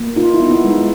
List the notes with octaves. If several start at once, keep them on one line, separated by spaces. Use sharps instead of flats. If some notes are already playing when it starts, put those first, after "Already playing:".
Already playing: A#3
D#4 F4
E4
B3
E4
G#3
D#4